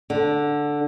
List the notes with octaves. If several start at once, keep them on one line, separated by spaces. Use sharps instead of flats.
D3